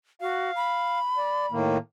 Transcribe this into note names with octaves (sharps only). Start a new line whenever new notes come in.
F#4 F5
B5
D5
A2 D#3 A#3